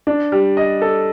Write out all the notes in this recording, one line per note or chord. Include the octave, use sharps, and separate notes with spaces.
D4
G3
D#5
A4